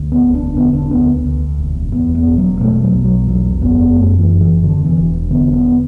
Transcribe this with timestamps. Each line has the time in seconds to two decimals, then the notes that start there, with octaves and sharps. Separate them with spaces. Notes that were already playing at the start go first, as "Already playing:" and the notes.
Already playing: D2
0.12 B3
0.23 E1
0.35 D4
0.57 D3 B3
0.73 D4
0.91 D2 B3
1.25 D2
1.58 E1
1.92 E2 B3
2.15 B3
2.26 E1
2.38 F#3
2.60 B2 A3
2.83 F#3
2.93 B1
3.04 F#3
3.28 E2 F#3
3.61 F#1 B3
3.96 F#2 A3
4.18 E3
4.30 F#1
4.40 E3
4.63 E2 D3
4.86 E3
4.96 E1
5.31 D3 B3
5.53 B3